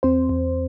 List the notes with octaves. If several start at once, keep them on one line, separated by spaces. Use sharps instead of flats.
E2 C4 C5
E2